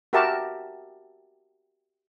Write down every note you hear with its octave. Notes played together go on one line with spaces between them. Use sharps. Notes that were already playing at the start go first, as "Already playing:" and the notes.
F#4 G4 A#4 E5 A5